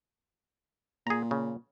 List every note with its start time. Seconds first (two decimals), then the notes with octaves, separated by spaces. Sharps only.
1.07 A#2 G#4 A#5
1.31 C#3